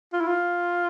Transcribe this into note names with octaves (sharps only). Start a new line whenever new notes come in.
F4
E4
F4